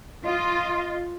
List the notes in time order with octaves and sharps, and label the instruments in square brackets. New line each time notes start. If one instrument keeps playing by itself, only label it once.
[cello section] F4 [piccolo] D#5